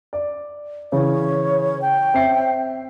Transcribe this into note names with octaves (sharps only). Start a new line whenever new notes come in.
D5
C#3 E3 C#5
G5
C4 E5 C7